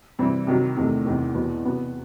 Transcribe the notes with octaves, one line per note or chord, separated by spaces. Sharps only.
C3 E3 G3 C4 E4
C3 D#3 F#3
E2 C3 D#3 A3
E2 C3 D#3
E2 B2 F#3 B3
C3 F#3 B3